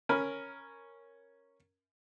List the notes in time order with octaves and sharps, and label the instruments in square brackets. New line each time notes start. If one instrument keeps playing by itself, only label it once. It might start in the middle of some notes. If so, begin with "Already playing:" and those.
[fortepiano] C#4 A#4 B5